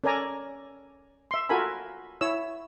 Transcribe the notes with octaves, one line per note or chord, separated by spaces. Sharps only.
C#4 A4 A#4 D5 G#5 A#5
E5 C6
F4 F#4 A4 A#4 G#5 B5
E4 C#5 E6